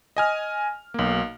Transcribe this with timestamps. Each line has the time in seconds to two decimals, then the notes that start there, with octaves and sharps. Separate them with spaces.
0.17 D#5 G#5 F6
0.94 B1 A#3